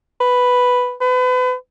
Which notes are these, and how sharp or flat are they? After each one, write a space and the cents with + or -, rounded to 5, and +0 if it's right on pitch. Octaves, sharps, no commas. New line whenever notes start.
B4 +5
B4 +35